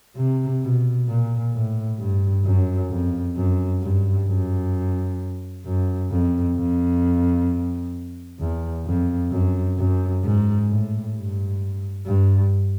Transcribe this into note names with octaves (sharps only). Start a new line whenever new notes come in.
C3
B2
A#2
A2
G2
F#2
F2
F#2
G2
F#2
F#2
F2
F2
E2
F2
F#2
F#2
G#2
A2
G2
G2